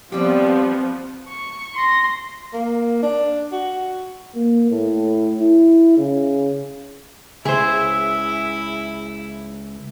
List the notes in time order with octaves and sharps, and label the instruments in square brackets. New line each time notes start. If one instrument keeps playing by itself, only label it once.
[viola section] F3 B3 [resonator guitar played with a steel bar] G3 G4 [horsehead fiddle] C4
[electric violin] C#6
C6 A#6
[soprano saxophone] A#3
D4
F#4
[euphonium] A#3
A2
E4
C#3
[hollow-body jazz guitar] C#2 C5 [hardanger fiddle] E4 [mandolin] G#4 E5